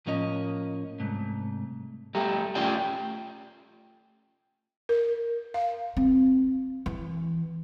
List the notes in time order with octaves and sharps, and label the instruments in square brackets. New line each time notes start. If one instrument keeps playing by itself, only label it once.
[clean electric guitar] A2 F3 A#3 C#4 D#5
C2 G#2 A3
[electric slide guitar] G3 A3 G4 A#5
A3 C#4 F4 G4 D5 G5
[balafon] A#4
F5
[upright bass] C4
E3